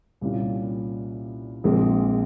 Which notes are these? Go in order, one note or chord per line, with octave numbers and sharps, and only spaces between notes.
C2 A#2 G3 C#4 F4
A#1 A#2 G#3 C4